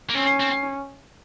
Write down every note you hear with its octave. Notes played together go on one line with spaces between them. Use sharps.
A#3
C4 C#4
C4